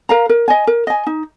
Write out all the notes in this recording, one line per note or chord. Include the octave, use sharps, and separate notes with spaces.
A#4 F5 A#5
A#4
D#5 G#5
A#4
D#5 G#5
D#4